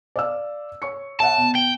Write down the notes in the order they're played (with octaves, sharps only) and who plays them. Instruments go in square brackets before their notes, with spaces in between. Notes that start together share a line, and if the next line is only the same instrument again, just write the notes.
[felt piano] D5 F5 E6
C#5 C#6 C#7
[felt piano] C#5 E5 F#5 [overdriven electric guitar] A5
[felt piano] B2
[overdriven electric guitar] G5